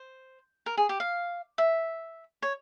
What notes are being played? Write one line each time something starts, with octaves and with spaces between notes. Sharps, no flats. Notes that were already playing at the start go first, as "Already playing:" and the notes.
Already playing: C5
A#4
G#4
G4
F5
E5
C#5